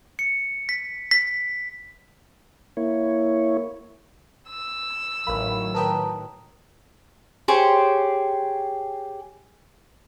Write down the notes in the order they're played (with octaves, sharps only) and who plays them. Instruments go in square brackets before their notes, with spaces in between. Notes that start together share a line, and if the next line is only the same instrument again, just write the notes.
[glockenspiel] C#7
B6
B6
[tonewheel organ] A#3 E4 C#5
[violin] E6
[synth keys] A1 B5 [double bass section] A2 D#3 F#3 [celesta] A#4 F5
[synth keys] A#4 B4 G5 [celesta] A5 A#5 D#6
[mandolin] G4 G#4 C5 C#5